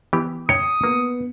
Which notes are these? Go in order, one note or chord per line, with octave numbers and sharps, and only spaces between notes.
E3 B3 G4
C#5 G5 D#6 C#7
A#3 B3